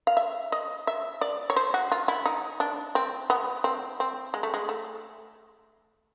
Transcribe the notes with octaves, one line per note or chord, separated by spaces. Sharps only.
F5
E5
D#5
E5
D5
C#5
C5
F#4
F4
E4
D#4
D4
C4
B3
C4
C4
G#3
A3
G#3
A3